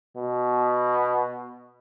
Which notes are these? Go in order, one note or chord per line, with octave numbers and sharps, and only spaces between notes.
B2